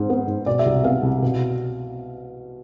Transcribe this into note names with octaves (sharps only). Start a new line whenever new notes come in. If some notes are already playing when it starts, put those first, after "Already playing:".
Already playing: G#2 G#3 C5
B3
G#2
B2 D5
E5
C2
B3 F5
C2
B2